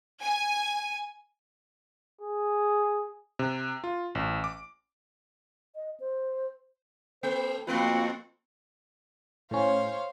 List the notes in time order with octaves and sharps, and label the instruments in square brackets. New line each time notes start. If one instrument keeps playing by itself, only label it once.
[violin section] G#5
[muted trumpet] G#4
[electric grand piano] C3
F4
A1
D6
[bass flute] D#5
C5
[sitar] A#3 [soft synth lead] A4 [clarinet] C5
[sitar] F2 A3 B4 [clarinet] A#3 [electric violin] C4 F#4 [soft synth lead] F4
[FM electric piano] A2 C#4 [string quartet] C5 C#5 F5